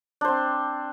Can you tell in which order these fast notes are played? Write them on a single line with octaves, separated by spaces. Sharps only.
D4 C5 C4